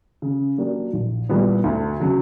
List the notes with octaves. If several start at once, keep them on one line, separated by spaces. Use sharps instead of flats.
C#3
F#3 A#3 D4 G4
A#1
A#2 G3 B3 E4
D2
C#3 F#3